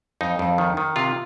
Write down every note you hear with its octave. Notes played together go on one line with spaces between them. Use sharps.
F2 D#4
F2
D#3
D#3
C3 F4